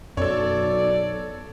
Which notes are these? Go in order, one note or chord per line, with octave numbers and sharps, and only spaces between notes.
B1 F#2 A4 C#5 D5